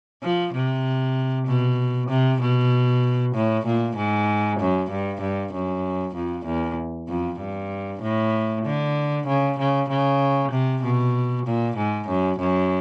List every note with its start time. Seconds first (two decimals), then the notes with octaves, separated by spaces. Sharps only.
0.23 F3
0.54 C3
1.47 B2
2.09 C3
2.41 B2
3.35 A2
3.66 A#2
3.97 G#2
4.60 F#2
4.90 G2
5.21 G2
5.53 F#2
6.15 F2
6.46 E2
7.09 F2
7.40 G2
8.02 A2
8.65 D3
9.27 C#3
9.59 C#3
9.89 C#3
10.51 C3
10.83 B2
11.46 A#2
11.77 G#2
12.08 F#2
12.39 F#2